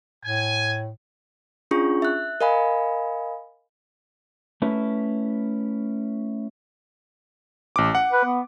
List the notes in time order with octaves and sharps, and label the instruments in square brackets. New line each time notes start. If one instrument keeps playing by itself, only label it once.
[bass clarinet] A2 [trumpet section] G#5
[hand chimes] C#4 D4 F4 G#4 C#6
E5 F#6
A#4 D#5 F5 G#5 B5
[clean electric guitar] A3 C#4 E4 B4
[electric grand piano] A1 D6
F#5
[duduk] B4
B3